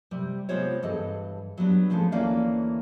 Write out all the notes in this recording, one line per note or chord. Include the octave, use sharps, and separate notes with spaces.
C3 G3
C3 G#3 B3 F4 C5 C#5
G2 E3 G#4 A4 D#5
F#3 G3 B3 D4
F3 G#3 A3 C#4
D2 E3 A#3 C#4 D5 F5